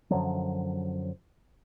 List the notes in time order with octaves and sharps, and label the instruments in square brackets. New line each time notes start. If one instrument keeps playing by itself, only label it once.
[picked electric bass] F#2 D3 F3 F#3